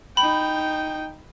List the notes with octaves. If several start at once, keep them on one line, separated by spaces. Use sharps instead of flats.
D#4 G5 B5